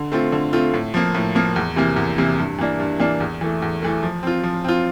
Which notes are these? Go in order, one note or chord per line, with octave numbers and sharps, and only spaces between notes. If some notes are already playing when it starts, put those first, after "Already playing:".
Already playing: D3
A3 C4 F4
D3
A3 C4 F4
A2
F3 A#3
A2
F3 A#3
E2
C3 E3 A#3
E2
C3 E3 A#3
G2
E3 A#3 D4
G2
E3 A#3 D4
E2
E3 A3
E2
E3 A3
F3
C4 F4
F3
C4 F4